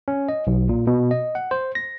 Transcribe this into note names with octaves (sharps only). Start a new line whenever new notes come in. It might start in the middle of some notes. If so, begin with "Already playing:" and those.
C#4
D#5
B1
A#2
B2
D#5
F#5
C5
A#6